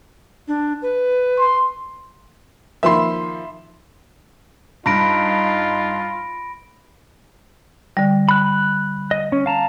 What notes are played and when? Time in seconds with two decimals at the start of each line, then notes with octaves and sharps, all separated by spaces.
0.48 D4
0.82 B4
1.39 C6
2.83 D#3 F3 A#3 E5 B5 C6
4.86 G2 D#4 F4 B5 A#6 D7
7.97 D3 G3
8.29 B5 F#6
9.11 D#5
9.32 C#4
9.46 F5 A5 A#5